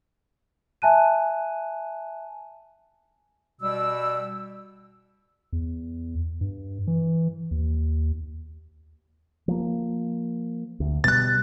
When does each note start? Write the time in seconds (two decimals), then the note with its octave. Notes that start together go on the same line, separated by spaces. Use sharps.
0.82 E5 G#5 A5 F#6 D#7
3.61 B2 G3 E6
5.53 E2
6.41 G2
6.87 E3
7.51 D#2
9.48 F3 A#3
10.80 D2
11.04 B2 G3 F#6 A6